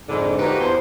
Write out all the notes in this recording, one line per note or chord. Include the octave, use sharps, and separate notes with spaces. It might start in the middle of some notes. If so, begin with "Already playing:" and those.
F2 G#2 D3
F3 A#3 D#4 F#4 G4 B4
E2 C5